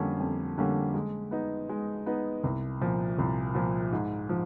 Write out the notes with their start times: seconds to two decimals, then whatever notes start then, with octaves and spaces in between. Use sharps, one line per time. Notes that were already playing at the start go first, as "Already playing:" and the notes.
Already playing: F2 D3 G3 A#3 C#4
0.20 F2
0.58 D3 G3 A#3 C#4
0.94 G#3
1.31 B3 D#4
1.69 G#3
2.06 B3 D#4
2.44 C2
2.81 A#2 F3
3.18 C2
3.54 A#2 F3
3.92 G#2
4.29 F3